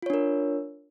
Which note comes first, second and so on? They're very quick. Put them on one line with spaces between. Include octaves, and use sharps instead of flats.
F4 C#5 D4 A#4